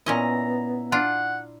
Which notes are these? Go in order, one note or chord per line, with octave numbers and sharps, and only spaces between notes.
A#2 B3 C#4 E4 D#5 A#5
D4 F4 F#5